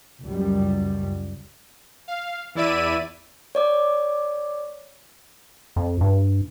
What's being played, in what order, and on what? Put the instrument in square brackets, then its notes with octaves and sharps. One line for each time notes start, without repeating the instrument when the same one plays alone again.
[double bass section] C#2 F#2 G3
[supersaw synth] F5
E2 E4 D5 E5 D#7
[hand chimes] C#5 D5 D6
[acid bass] F2
G2